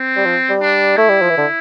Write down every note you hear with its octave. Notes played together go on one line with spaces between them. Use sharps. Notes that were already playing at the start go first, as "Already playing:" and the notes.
Already playing: C4
G3
F3
G3
D4
A3 E4
G3
F3
E3
D3